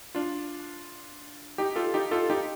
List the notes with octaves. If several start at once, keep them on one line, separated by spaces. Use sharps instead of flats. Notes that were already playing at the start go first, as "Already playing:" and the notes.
D4 F4
D#4 G4
F4 A4
D#4 G4
F4 A4
D#4 G4